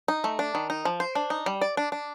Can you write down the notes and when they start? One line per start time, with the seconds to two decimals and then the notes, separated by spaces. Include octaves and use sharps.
0.08 D#4
0.24 A3
0.39 D4
0.55 D#3
0.70 D#4
0.85 F3
1.00 C5
1.15 D4
1.30 D#4
1.46 G3
1.61 D5
1.77 D4
1.92 D4